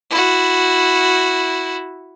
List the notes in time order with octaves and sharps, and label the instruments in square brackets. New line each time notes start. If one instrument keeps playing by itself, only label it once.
[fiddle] E4 F#4